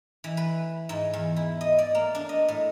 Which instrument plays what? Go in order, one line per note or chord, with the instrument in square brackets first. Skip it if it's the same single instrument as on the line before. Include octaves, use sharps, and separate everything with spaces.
[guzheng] E3
B4
G#2
E2
E4
D#5
D5
A#3
D4
D#5
A2